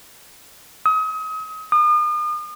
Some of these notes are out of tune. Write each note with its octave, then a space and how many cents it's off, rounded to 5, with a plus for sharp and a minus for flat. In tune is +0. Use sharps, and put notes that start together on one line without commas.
D#6 +35
D#6 -40